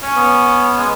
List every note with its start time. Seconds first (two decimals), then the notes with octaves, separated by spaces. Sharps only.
0.02 C#4
0.15 B3
0.78 G#3